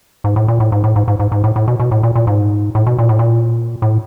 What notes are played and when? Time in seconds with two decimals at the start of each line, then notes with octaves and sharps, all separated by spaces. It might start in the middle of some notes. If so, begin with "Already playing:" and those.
0.24 G#2
0.36 A2
0.48 A#2
0.60 A2
0.72 G#2
0.84 A2
0.96 G#2
1.08 G#2
1.20 G#2
1.32 G#2
1.44 A2
1.56 A2
1.68 B2
1.80 B2
1.91 A2
2.03 A#2
2.15 A#2
2.27 G#2
2.75 A2
2.86 B2
2.99 A#2
3.09 A2
3.19 A#2
3.82 A2